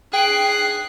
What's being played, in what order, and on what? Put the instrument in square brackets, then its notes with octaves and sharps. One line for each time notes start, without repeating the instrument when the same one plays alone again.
[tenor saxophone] G#4 [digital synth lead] G5 [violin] F#6 C7